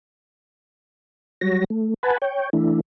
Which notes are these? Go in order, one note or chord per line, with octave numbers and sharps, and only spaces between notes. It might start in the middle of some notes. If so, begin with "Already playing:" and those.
F#3 G3 F#4 C#5 A#6
A3
B4 F#5 G#5 A5 B5
C#5 G5
E3 A3 D4 E4